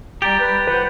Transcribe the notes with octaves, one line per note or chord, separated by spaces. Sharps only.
G3 G4 A#5 G6 A6
B4
F4 B4 C5 F#5